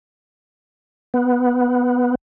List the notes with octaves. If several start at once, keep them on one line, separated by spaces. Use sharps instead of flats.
B3